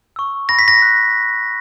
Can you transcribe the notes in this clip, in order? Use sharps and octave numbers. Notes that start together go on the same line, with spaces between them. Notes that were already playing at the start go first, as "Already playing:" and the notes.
C#6 E6
B5 A#6
B6
A#6
F#6